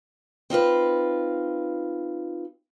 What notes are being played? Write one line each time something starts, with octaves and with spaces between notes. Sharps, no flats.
C4 D#4 F4 B4